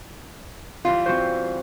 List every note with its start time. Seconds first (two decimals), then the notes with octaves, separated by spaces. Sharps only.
0.85 E3 G3 F4
1.06 C4 F#4 C5